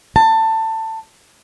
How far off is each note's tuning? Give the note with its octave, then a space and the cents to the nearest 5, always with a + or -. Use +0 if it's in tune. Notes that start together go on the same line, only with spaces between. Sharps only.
A5 +20